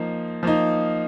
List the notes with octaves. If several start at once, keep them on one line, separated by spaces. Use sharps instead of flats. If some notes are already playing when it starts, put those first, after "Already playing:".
Already playing: F3 A#3 D#4
F3 A#3 D#4